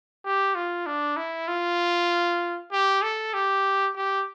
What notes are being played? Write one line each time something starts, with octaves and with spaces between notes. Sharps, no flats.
G4
F4
D4
E4
F4
G4
A4
G4
G4